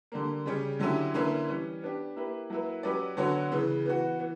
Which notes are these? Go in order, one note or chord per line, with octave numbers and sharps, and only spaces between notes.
D3 G3 A#3
C#3 G3 C#4
D3 F#3 C#4 E4 G4
D3 A#3 C#4 E4 B4
E3 G3 C#4
B3 D4 G4
A#3 E4 G4 B4
F#3 A#3 E4 B4
F#3 C#4 G4 B4 D5
D3 F#3 B3 F#4 C#5
C#3 E3 B3
E3 B3 F#4
E3 B3